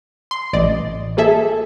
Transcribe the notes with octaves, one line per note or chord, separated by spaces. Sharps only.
C6
A1 D5 D#5
A#3 G#4 A4 E5